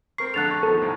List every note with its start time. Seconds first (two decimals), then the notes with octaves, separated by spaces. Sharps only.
0.18 C4 A#4 C#6 C7
0.34 A#1 D3 A4 F#6 A6 F7
0.51 C#6
0.63 D#3 F3 B3 A4
0.82 C2 A2 C#3